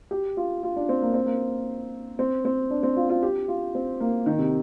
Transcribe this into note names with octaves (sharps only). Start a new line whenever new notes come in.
G4
F4
F4
D4
C4
A#3
C4
A#3
C4
C4
D4
C4
F4
F4
G4
F4
C4
A#3
D#3
C3